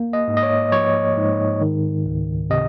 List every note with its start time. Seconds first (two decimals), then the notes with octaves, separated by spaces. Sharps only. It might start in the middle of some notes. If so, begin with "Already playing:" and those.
Already playing: A#3
0.13 D#5
0.28 G#2
0.37 D#5
0.43 C#5
0.72 F3 C#5
1.17 G#2
1.61 D#3
2.06 C#2
2.50 C3 D#5